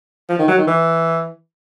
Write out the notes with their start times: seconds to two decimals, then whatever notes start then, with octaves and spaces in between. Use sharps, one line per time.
0.29 F3
0.39 D#3
0.48 F#3
0.58 D#3
0.67 E3